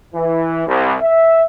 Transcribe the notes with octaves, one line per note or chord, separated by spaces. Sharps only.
E3
C2
E5